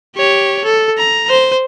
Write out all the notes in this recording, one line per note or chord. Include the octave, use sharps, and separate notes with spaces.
G4 C#5
A4
A#5
C5